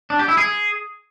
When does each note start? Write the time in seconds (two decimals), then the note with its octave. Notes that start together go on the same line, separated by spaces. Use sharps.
0.10 D4
0.19 G4
0.28 E4
0.37 G#4